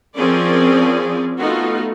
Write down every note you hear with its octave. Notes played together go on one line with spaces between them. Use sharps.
F3 C4 C#4 G#4 A#4 D5
A3 B3 D#4 F4 F#4